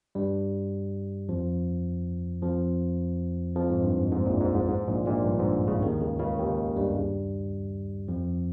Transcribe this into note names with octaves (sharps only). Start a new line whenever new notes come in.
G2 G3
F2 F3
F2 F3
F2 F3
G#2
G2
G#2
G#2
A#1 A#2
G#2
G#2
G#2
A#1 A#2
A#1 A#2
G2
G#2
C#2 C#3
D#2 D#3
C#2 C#3
C#2 C#3
D#2 D#3
G2 G3
F2 F3